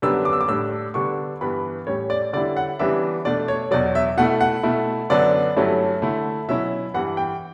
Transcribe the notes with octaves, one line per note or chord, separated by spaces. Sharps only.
F#2 D3 G3 B3 D4 E6
D6
E6
D6
A2 G3 D4 E6
D3 G3 B3 D4 C#6
G2 E3 B3 B5
A2 G3 C#4 C#5
D5
D3 G3 C#4 E4 D5
F#5
C#3 E3 G3 B3 D4 E5
B2 A3 D4 D5
C#5
E2 B2 F#3 D5
E5
B2 A3 E4 F#5
F#5
B2 A3 E4
F#2 D3 F#3 B3 D4 D5
G2 F#3 A3 C#4 E4
D3 A3 E4
B2 F#3 C#4 E4 E5
G2 E3 G3 F#5
G5